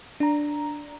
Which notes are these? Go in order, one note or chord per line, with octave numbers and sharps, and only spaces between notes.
D4 A#5